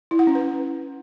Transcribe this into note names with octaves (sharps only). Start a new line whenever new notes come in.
E4
F#5
C#4
B4